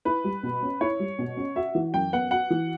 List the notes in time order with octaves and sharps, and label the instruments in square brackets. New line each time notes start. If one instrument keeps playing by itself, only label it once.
[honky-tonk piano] E4 [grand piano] B4
[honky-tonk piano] G3
B2
C#4
[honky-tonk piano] E4 [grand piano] C#5
[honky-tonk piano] G3
B2
C#4
[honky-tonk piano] F#4 [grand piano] E5
[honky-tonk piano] E3
[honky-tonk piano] F#2 [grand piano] G5
[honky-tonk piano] B3 [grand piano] F#5
[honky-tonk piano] F#4 [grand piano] F#5
[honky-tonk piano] E3